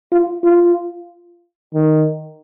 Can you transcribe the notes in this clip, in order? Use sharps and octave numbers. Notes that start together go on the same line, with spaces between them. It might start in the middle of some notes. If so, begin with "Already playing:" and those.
F4
F4
D#3